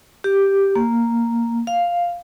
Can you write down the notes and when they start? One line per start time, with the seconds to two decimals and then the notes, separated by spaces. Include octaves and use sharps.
0.24 G4
0.75 A#3
1.67 F5